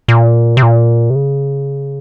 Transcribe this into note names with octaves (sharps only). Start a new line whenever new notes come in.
A#2
C3
A#2
C3
C#3